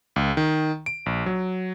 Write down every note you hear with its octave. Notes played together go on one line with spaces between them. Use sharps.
C#2
D#3
D7
A#1
F#3